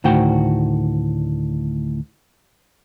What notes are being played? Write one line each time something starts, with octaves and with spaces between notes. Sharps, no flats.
D2 A2 D#3 F#4 C5 G5